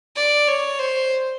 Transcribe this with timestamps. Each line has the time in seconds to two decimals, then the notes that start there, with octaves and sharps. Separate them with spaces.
0.16 D5
0.47 C#5
0.79 C5